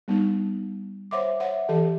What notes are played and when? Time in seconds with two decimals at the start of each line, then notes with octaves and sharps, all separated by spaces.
0.08 G3 B3 D#4
1.11 C5 C#5 E5 F#5 C6 D6
1.40 C#5 E5 F#5
1.69 E3 G4 A4 A5